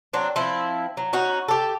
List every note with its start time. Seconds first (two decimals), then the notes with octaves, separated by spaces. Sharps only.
0.13 F#3 C4 D4
0.36 F3 C4 E4
0.97 F#3
1.13 C#4 D#4 F#4
1.48 G4 A4